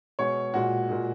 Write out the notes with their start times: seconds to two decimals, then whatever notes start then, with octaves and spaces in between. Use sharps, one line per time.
0.19 B2 G#3 C#5
0.54 A#2 G#3 F#4
0.89 A#2 G#3